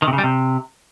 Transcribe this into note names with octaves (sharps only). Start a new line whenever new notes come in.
D#3
C3
C#3
G3
C3